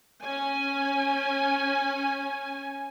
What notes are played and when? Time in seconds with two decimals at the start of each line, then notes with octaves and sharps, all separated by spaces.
0.23 C#4 G#5